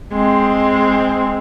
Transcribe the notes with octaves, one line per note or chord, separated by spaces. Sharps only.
G#3 C4